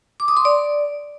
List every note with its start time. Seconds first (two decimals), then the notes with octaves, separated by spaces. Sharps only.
0.20 D6
0.28 D#6
0.37 C6
0.45 D5